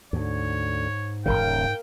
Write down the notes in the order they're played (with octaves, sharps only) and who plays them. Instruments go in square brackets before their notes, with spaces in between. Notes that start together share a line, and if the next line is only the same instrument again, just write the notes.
[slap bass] D2 [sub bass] G#2 [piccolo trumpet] C#5
[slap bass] D#1 G#1 C#3 [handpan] A#4 F5 [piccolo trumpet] G5